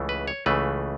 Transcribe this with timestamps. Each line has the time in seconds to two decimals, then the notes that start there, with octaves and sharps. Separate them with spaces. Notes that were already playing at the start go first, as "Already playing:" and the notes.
Already playing: C#2 C#3 E3 A3
0.09 B4
0.28 C#5
0.46 C#2 C#3 E3 A3 B4